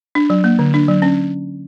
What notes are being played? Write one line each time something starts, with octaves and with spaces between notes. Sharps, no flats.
D4
F#3
A#3
D3
D4
F#3
C#4